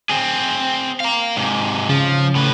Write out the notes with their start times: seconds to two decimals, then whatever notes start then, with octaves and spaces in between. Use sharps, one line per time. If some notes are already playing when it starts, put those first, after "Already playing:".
0.09 C4 G#4
1.00 F5 A#5
1.36 G#2 C3
1.89 C#3 F3
2.35 A2 B4